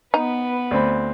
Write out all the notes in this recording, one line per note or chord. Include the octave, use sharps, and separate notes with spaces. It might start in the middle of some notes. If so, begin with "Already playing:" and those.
B3 D#4 B4
D2 C4 B5